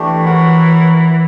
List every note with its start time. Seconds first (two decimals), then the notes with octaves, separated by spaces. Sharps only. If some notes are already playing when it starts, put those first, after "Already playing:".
Already playing: E3 A3 D4 G4
0.25 F#4 A#4 C#5 F#5